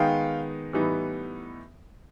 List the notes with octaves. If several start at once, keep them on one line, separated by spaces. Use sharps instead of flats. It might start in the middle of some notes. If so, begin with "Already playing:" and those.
Already playing: D#3 G#3 B3 D#4 F5 G5
A2 E3 G3 B3 D#4